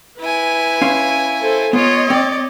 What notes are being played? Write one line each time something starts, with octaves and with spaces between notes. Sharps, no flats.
E4 B4 G#5
C#4 F5 C6
A4 C5
B3 F4 C#5 D#5
C4 D5